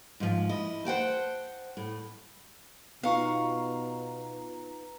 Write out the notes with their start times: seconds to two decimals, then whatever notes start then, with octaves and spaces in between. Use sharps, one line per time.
0.20 G#2 F3
0.49 E4 D#5
0.85 C5 F#5 G5 A5
1.77 A2
3.03 B2 B3 D#4 F4 B4 F5 A#5 C#6